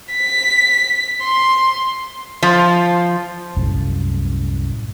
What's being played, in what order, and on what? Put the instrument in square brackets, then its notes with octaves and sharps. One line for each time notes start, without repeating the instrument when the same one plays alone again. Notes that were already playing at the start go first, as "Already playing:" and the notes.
[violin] B6
C6
[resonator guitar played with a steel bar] F3
[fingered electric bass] C2 F#2 A2